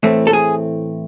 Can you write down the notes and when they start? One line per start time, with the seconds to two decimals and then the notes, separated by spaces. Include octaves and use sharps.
0.03 A2 E3 A3 C4
0.27 A4
0.33 G#4